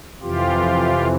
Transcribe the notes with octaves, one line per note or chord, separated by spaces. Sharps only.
F2 C3 E3 F4 G4